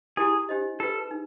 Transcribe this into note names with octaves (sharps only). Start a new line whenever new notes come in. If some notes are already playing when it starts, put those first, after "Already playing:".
E4 G4 G#4 A#4
D4 G4 C5 D#5
F4 G#4 A4 B4
D#4